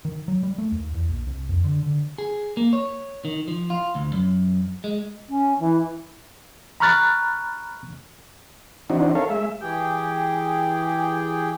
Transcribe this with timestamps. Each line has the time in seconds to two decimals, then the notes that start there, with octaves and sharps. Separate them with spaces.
0.05 D#3
0.28 F#3
0.43 G3
0.58 A3
0.72 D#2
0.94 E2
1.09 A#1
1.27 C2
1.49 F2
1.64 D3
1.83 D3
2.18 G#4
2.57 A#3
2.73 C#5
3.25 D#3
3.48 F3
3.70 F4
3.95 D2
4.13 F#2
4.84 G#3
5.29 C#4
5.59 E3
6.80 A#5 B5 C#6 F6 F#6 A6
8.90 E3 C4 D4 D#4 F#4
9.15 A4 A#4 C#5 F5
9.30 G#3 E5
9.60 E3 G4 G#4 G5